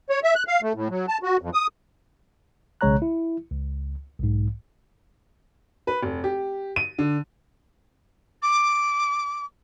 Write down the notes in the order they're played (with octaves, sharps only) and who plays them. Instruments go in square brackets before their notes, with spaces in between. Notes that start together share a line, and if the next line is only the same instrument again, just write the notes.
[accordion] C#5
E5
F#6
F5
A3
A2
F#3
A5
F#4
F2
D#6
[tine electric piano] B1 C#3 G#3 C#5 A#5 F#6
E4
C#2
B1 G#2
[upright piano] B4
F1
G4
D#7
D3
[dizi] D6